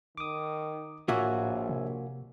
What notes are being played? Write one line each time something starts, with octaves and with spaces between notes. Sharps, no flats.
D#3 D6 D#6
A#1 A2 A#3 F4 F#4 C#5 E5 G#5
C3